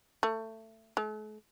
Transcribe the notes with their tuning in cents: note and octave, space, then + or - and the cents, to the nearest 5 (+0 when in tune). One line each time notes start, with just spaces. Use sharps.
A3 +20
A3 -45